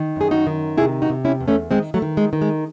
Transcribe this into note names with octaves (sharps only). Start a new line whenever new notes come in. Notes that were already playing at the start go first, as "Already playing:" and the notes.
Already playing: D#3
F#2 G#4
D#4 F#4
D#3
C3 E4 G#4
D#4 F#4
C3
C#4 E4
E2
A3 C#4
D#3 G#3 C4
F#3 A3
D#3
G#3
D#3
G#3